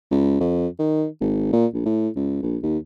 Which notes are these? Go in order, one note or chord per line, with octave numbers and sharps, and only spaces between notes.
C#2
F2
D#3
G#1
A#2
A#1
A2
C#2
A#1
D#2